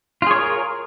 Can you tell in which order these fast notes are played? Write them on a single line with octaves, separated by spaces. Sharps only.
F4 G#4 C#5 A#4